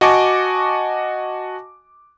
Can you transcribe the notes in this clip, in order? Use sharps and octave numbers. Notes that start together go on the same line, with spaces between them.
F#4 D#5 G#5 A5 C#6 D6